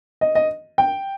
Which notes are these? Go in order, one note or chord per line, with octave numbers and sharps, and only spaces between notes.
D#5
D#5
G5